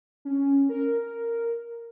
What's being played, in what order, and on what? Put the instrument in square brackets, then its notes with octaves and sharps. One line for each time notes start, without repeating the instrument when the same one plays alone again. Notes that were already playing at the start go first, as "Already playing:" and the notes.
[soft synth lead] C#4
A#4